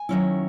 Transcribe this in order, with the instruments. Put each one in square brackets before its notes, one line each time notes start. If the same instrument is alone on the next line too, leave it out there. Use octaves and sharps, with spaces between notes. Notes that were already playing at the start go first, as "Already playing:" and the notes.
Already playing: [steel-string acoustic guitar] G#5
D#3 F#3 C#4 E4